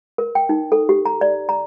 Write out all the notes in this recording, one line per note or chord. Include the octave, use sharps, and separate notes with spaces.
A#4
G5
D#4
A4
G4
A#5
D5
A#5